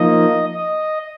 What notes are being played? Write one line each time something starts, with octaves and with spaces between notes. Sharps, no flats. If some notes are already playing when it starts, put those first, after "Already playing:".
Already playing: F3 A#3 D#4 D#5
D#5